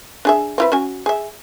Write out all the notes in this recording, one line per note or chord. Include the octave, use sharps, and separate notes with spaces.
D4 G#4 E5
C4 E4 B4
C#4 F#4 G#5
G#4 E5